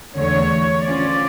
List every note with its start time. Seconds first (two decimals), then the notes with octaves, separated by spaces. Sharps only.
0.16 E2 D3 A3 C#5
0.86 D3 F3 C#4 F4 D5